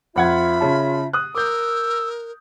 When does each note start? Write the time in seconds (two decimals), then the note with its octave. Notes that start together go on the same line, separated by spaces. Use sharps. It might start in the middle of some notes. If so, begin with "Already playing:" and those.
0.16 F2 F4 E5 F#5 B5 G#6
0.61 C#3 A5
1.13 D#6 F#6
1.35 A#4 D6 E6 G6